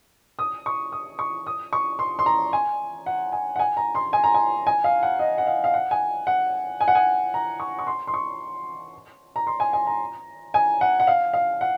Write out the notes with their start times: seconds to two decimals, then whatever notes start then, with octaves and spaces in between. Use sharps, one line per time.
0.39 D#6
0.66 C#6
0.92 D#6
1.19 C#6
1.47 D#6
1.73 C#6
1.99 C6
2.19 C6
2.26 A#5
2.53 G#5
3.06 F#5
3.32 G#5
3.56 F#5
3.59 G#5
3.77 A#5
3.95 C6
4.13 G#5
4.24 A#5
4.34 G#5
4.67 G#5
4.84 F5
5.03 F#5
5.19 D#5
5.38 F#5
5.47 F5
5.64 F5
5.74 F#5
5.91 G#5
6.27 F#5
6.81 G#5
6.88 F#5
6.95 G#5
7.34 A#5
7.60 C#6
7.79 C#6
7.87 C6
8.07 C6
8.14 C#6
9.36 A#5
9.47 C6
9.60 G#5
9.73 G#5
9.87 A#5
10.54 G#5
10.81 F#5
11.00 F#5
11.07 F5
11.33 F5
11.61 F#5